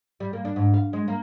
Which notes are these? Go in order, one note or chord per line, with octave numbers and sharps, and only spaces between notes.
G3
A#3
D4
G#2
F5
G#3
A#3